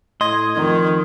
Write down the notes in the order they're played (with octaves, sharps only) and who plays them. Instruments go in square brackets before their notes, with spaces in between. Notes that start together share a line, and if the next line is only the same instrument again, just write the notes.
[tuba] A2 [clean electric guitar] D#5 [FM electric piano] C6 G#6
[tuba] F2 [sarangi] D#3